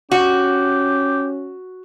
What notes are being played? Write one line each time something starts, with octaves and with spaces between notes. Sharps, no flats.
C#4 F#4 G4